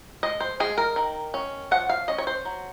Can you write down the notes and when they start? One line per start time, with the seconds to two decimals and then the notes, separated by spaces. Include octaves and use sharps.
0.23 G#3 D#5
0.40 C5
0.60 G#3 G#4
0.78 A#4
0.96 D#3
1.34 C#4
1.71 F3 F#5
1.89 F5
2.08 C#4 D#5
2.18 C#5
2.27 C5
2.45 F#3